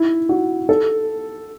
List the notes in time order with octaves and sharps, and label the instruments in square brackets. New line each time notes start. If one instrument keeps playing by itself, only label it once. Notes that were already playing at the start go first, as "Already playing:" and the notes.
Already playing: [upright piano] E4
F#4
A4